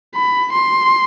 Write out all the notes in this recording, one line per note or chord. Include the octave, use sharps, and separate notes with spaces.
B5
C6